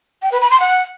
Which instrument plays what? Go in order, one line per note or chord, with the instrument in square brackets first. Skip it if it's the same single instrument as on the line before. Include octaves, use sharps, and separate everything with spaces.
[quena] G5
B4
B5
C6
F#5